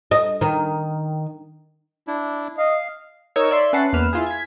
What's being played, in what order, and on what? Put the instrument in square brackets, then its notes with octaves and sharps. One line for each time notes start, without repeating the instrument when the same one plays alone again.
[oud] D#5
D#3
[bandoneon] D4 E4
[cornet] D#5 [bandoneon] F5
[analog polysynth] D#4 A#4 C#5 E6 G#6
D5 E5 C6
C#4 B4 E5 F#5 A5 C7
E2 A#3 B4 F6 E7
E4 F4 G#4
G#6 B6